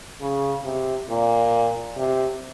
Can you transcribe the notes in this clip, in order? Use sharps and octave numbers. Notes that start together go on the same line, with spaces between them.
C#3
C3
A#2
C3